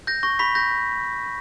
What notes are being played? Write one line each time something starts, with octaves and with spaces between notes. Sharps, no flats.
G6 A#6
C#6 A#6
B5 C#6 B6
G6 A#6